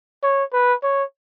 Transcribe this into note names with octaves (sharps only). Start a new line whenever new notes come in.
C#5
B4
C#5